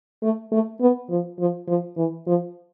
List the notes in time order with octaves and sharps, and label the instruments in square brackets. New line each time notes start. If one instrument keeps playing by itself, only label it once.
[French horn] A3
A3
B3
F3
F3
F3
E3
F3